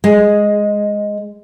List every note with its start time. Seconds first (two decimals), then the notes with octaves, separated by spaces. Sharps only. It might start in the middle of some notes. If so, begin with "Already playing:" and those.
0.04 G#3